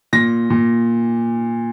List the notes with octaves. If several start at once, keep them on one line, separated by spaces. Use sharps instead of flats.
A#2 A#6
A#2